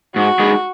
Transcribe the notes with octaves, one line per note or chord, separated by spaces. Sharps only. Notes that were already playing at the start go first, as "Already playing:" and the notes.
G#2 F#4
G#3 D#4 G#4 B4